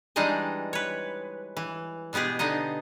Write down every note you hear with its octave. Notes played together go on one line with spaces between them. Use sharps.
E3 G3 G#3 D4 D#4 D#5
B4 C#5
E3
B2 G#3 B3 G4 G#4
D3 B3 D#4 D#5